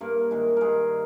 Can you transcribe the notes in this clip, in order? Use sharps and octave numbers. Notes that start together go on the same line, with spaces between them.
G2 A#3 A#4
D#3 G#3
G2 G#3 G#4 A#4